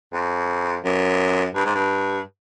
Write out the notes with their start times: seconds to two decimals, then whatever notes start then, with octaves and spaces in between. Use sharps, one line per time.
0.13 F2
0.84 F#2
1.55 G2
1.65 G#2
1.75 G2